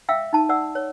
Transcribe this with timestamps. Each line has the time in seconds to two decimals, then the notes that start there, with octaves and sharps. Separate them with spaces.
0.09 E5 F5 G5 E6
0.33 D#4 A5
0.49 D5 F#5 E6
0.75 C#5